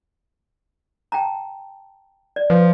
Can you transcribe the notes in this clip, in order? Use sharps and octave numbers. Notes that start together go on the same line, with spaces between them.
G5 A5 A#5
D5
F3 B4